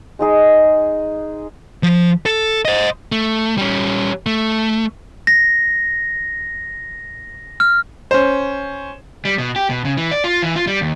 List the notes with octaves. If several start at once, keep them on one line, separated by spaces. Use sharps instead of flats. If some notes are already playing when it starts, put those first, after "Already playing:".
G#3 D#4 G#4 D#5
F3
A4
C5 D#5
A3
G3 C#4
A3
A#6
F6
C#4 C5
G3
B2
G4
B2
C#3
E3
D5
F4
E3
F4
G3
D#2